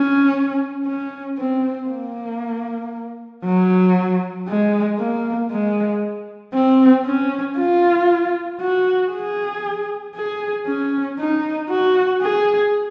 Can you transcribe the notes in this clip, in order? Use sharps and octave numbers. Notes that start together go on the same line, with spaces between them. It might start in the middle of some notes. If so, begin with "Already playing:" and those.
Already playing: C#4
C#4
C4
A#3
F#3
G#3
A#3
G#3
C4
C#4
F4
F#4
G#4
G#4
C#4
D#4
F#4
G#4